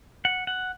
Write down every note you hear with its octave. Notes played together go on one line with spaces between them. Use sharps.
F#5
F#5